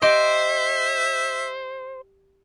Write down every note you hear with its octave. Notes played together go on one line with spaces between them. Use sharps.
G4 C5 D#5 E5 D6